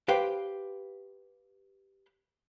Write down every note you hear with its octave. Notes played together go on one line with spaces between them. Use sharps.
G4 B4 C5 F5 G5